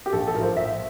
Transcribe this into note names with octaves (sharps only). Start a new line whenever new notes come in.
G4
A#1 A4
A4
A2 F3 A#4 C5
A#1 E5